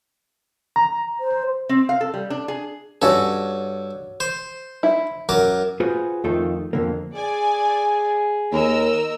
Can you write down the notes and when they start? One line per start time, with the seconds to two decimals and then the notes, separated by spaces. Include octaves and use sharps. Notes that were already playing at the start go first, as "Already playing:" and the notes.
0.76 A#5
1.20 C5
1.69 C4
1.89 F5
2.01 A4
2.14 G3
2.30 D4
2.48 G#4
3.02 G2 C#4 F#4 A4
4.20 C5
4.83 E4
5.29 F#2 A#4 D6
5.80 F4 F#4 G#4 B4 C5
6.24 F2 D#3 A3 D#4 F4 A4
6.73 F2 D3 A#3
7.15 G#4 D5 G#5
8.52 D#2 A#4 D#5 E6